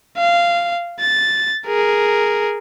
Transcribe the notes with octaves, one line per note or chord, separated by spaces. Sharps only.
F5
A6
G#4 A#4